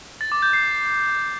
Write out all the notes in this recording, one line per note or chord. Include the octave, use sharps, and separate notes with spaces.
A6
D6
G6
C7